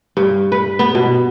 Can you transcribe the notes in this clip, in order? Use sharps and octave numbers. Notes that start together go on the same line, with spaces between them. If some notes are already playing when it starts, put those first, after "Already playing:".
G2
B4
B3
B2